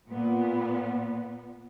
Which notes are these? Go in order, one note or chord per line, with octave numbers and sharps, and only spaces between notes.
A#2 B3